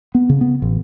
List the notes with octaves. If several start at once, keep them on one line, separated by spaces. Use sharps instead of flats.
B3
C#3
B3
A1